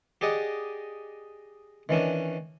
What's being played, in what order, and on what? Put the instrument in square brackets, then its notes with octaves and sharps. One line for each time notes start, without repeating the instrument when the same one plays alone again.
[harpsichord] G4 G#4 D5 D#5 F#5
D#3 E3 C#4 D4